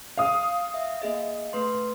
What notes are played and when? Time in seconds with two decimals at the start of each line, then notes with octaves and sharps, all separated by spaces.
0.17 F5 D#6
0.74 E5
1.02 A#3 G#4 D#5
1.53 A3 B4 C6